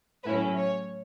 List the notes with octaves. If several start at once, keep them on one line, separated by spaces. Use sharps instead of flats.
A2 F#3 C#4 E4 B4
C#5